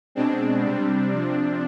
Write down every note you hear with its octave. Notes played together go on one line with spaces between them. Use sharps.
B2 G#3 C4 D4
C3 G3 C4
C3 F3 C4